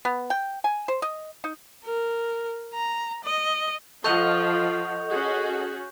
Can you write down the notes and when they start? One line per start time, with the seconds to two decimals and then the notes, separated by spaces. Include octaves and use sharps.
0.05 B3
0.30 G5
0.64 G#5
0.88 C5
1.02 D#5
1.44 D#4
1.85 A#4
2.74 A#5
3.24 D#5
4.04 F3 F4 A4 D#5 F#5 C#6 G6 F7
5.09 C#4 F#4 G#4